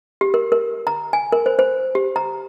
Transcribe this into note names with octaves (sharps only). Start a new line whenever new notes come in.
G4
A#4
A#4
A#5
G#5
A#4
C5
C5
G4
A#5